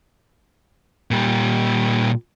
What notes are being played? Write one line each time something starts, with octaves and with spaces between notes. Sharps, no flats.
A#2 G3